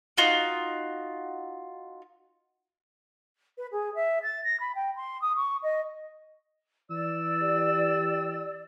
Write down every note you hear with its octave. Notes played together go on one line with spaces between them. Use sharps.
D#4 F4 F#4
B4
G#4
E5
A6
A#6
B5
G5
C6
D#6
C#6
D#5
E3 D5 E6
G4